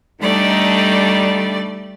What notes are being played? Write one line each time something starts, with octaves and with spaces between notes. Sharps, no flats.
D3 G3 A3 D4 D#4 D5